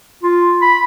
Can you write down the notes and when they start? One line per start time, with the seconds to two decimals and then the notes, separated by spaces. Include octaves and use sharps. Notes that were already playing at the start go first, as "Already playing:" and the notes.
0.23 F4
0.61 B5